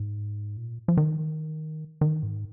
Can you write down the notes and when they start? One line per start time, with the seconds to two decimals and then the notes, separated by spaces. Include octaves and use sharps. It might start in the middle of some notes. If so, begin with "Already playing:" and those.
Already playing: G#2
0.57 A#2
0.88 F3
0.97 D#3
2.01 D#3
2.23 G#2